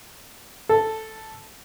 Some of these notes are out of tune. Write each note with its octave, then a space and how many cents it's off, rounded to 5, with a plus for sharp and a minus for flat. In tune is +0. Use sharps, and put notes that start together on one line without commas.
A4 +0